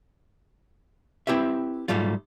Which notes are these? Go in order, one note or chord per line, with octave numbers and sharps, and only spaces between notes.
C4 E4 G4 B4 E5
G#2 F#3 G3 A3 F4